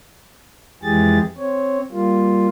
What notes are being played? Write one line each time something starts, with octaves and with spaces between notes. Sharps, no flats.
F2 E3 G#3 G4 G#4 A6
C4 C#5
G3 A#3 F4